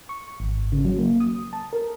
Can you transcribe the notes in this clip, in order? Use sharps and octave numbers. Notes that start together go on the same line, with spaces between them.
C#6
G#1
C#3
F#3
A#3
D#6
A5
A#4